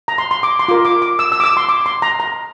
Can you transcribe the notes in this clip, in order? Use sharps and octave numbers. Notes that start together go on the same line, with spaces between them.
A#5
C6
C6
D6
C6
F4 A#4 D6
D6
D6
E6
E6
D6
E6
C6
D6
C6
A#5
A#5